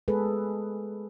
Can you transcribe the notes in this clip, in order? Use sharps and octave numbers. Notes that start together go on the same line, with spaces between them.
G#3 G#4 A4 B4